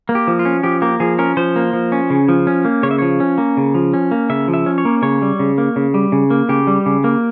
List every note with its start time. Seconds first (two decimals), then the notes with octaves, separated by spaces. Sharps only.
0.09 A#3
0.15 G4
0.27 F3
0.39 F4
0.45 C#4
0.63 F3 G4
0.82 A#3 G4
1.00 F3 G#4
1.18 C#4 A#4
1.37 F3 C5
1.56 A#3
1.73 F3
1.92 C#4
2.10 C#3
2.29 F3
2.47 C#4
2.65 A#3
2.83 C#3 C#5
2.91 E5
2.98 F3 C#5
3.20 C#4
3.38 A#3
3.57 C#3
3.75 F3
3.94 C#4
4.11 A#3
4.30 C#3 E5
4.48 F3
4.54 E5
4.66 C#4
4.78 C#5
4.85 A#3
5.02 C#3 C#5
5.22 G3
5.39 C#3
5.58 A#3
5.76 C#3
5.94 G3
6.12 C#3
6.30 A#3
6.49 C#3 G4
6.67 G3
6.86 C#3
7.04 A#3